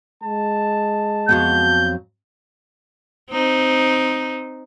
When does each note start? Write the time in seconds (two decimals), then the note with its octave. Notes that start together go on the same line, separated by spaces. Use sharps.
0.23 G#3 A5
1.29 F2 F#3 B3 G6
3.32 C4 D#4